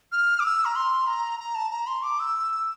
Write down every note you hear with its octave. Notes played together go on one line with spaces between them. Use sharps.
F6
D6
E6
A#5
C6
A#5
A#5
A5
A#5
C6
D6
E6